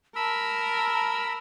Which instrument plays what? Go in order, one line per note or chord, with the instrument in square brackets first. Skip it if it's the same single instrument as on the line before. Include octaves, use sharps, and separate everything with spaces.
[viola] A#4 [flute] A5 [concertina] B5 E6